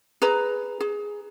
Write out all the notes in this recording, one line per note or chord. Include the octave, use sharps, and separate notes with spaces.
G#4 B4 A#5
G#4